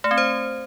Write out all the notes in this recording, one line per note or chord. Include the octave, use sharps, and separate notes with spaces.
A3
C4
C5